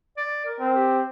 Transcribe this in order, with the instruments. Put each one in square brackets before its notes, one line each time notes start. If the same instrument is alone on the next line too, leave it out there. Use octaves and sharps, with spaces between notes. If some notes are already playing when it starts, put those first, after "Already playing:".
[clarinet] D5
A#4
[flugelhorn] C4
[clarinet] G4